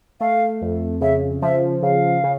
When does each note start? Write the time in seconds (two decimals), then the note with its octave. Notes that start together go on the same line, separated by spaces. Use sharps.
0.21 A3 F5
0.62 F2
1.01 C#3 E5
1.42 F3 E5
1.83 C#3 F5
2.24 C#3